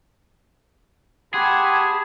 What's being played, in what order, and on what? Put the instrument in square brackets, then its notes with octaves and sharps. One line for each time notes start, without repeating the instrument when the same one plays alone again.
[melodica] G4 F#5 C6 [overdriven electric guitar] G#4 [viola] A5 B5 [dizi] G#6